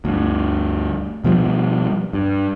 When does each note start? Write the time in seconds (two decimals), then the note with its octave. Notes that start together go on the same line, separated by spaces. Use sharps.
0.05 D2 G2
1.24 B2 F3 G3
2.13 G2